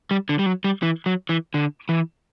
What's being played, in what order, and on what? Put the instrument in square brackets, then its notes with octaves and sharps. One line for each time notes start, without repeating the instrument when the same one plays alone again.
[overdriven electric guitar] G3
D3
G3
F#3
G3
E3
F#3
E3
D3
E3